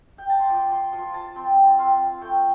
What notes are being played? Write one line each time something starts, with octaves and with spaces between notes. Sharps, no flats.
G5
A5
C6
F3 D6
C6
F3 C6
A5
C4 G5
C4 F5
A3 G5